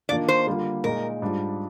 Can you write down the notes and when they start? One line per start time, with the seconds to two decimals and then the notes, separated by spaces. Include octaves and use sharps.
0.09 D#3 A#3 D4 F4 D5
0.28 C5
0.47 D3 G3 A#3 F4
0.84 A#2 G#3 D#4 A#4
1.22 G#2 G3 D4 F4